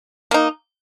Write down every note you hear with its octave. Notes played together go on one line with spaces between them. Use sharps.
A#3 D#4